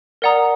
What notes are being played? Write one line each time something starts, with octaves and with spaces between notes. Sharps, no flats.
A#4 D5 F#5 A#5 D#6